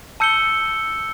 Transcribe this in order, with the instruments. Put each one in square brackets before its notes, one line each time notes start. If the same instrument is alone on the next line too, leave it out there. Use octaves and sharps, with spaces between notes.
[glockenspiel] A5 E6 G6 C#7 G7